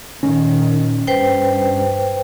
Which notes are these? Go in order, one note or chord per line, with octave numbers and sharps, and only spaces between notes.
A#2 D#3 C#4
G2 B4 C5 G5